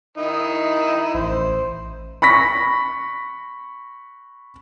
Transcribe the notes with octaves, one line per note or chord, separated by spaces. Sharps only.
D#3 D#4 E4
A1 C5
B5 C#6 A#6 B6